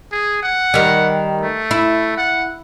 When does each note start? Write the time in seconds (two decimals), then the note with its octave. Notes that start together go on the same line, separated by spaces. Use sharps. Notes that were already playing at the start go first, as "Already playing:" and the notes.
0.12 G#4
0.43 F#5
0.74 D#3 G3
1.41 A3
1.71 E4
2.17 F#5